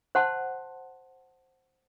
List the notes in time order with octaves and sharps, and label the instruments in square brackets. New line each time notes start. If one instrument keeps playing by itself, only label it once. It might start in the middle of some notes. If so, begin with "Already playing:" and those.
[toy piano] C5 F#5 A5 C6